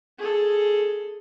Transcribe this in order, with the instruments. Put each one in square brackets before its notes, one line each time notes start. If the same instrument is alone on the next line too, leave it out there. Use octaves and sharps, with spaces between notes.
[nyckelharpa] G#4 A4